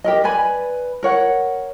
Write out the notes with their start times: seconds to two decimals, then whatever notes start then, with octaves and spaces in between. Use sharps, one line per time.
0.04 G4 A#4 D#5
0.24 B4 D5 G#5 B5
1.03 A#4 C#5 F#5